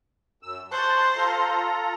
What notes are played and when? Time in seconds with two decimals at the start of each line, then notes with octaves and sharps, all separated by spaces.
0.43 F#2 E6
0.72 C5 A5 C#6 F#6
1.17 F4 A4 A#5